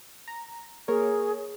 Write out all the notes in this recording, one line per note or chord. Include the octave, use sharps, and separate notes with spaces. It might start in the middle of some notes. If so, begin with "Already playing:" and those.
A#5
A#3 G#4 A#4 C#5